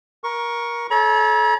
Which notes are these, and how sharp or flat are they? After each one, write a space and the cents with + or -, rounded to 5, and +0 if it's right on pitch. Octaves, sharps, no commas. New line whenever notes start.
A#4 +20 C#6 +0
A4 -30 C#5 +0 A#5 +45